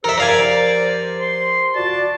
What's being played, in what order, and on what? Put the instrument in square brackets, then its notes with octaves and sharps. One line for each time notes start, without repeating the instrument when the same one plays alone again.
[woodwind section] F3 G4 C5 [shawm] A4 [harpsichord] A#4 E5
[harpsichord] A#4 F5 G#5 [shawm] D5
[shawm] C6
[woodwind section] F4 F#4 D5 [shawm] A5